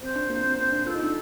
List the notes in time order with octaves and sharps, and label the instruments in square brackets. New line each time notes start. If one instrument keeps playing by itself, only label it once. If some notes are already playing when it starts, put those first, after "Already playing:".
[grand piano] C4 [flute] C5
[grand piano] D4
A#3
C4
C4
D4
[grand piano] F4 [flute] A4
[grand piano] D#4
D4